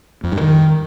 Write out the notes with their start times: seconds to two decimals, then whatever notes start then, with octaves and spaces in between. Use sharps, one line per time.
0.24 F2
0.32 G2
0.41 D#3